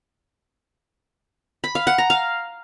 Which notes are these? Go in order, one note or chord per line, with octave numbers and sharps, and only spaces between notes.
B5
F5
F#5
A#5
F5